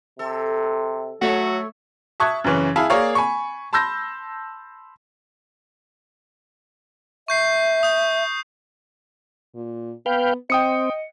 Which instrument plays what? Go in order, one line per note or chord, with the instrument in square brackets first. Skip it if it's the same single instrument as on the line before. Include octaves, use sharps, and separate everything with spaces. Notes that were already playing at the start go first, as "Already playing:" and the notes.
[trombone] C3 [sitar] A4
[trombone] F#3 [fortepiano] A3 [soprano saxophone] F#4 [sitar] A4 C#5 E5
[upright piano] E5 A5 C#6 D#6 F#6 G#6
F#2 C#3 E3 C#4
E4 G#4 F5 G#5 A5
A#3 G#4 A#4 C#5 D5 F5
G#5 B5 C#6
A5 B5 C6 E6 G6 A#6
[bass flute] E5 [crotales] C#6 G6 C7
[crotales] D#6 G6
[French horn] A#2
[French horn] B3 [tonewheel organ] B4 F5 G5
[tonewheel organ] C4 [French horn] D#5 [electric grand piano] G5 D#6 C#7